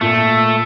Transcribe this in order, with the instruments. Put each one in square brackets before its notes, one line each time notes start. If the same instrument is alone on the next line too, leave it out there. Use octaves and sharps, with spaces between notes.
[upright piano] A#2 [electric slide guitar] A3